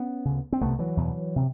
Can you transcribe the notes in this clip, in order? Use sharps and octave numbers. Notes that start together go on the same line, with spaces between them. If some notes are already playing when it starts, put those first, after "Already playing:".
Already playing: B3 C#4
D2 C#3
C4
C2 C3 A3 B3
E3 F#3
E2 B2
C3